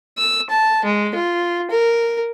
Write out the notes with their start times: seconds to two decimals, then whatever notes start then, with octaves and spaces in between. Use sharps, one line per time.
0.18 E6
0.50 A5
0.85 G#3
1.15 F4
1.71 A#4